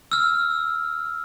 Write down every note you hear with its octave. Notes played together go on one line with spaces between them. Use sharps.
E6 F6